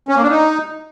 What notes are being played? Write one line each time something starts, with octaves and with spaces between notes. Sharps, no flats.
C#4
A#3
D4
D#4